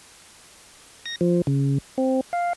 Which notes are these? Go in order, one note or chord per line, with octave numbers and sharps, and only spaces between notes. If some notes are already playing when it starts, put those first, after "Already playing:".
A#6
F3
C#3
C4
F5